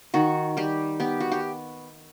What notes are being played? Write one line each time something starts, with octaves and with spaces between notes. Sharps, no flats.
D#3 F#4
G3 G4
B3 G4
F#4
G4